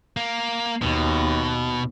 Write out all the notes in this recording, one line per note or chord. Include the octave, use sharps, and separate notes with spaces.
A#3
D#2 B2